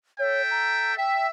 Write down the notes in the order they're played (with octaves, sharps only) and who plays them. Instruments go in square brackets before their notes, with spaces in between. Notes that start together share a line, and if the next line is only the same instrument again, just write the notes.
[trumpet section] A4 E5 G5 [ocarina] C#5
[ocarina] A#5
[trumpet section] E5 [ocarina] G5